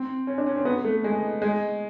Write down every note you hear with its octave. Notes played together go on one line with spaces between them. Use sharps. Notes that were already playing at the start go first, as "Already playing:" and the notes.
Already playing: C4
C#4
D4
C#4
C4
B3
A3
G#3
G#3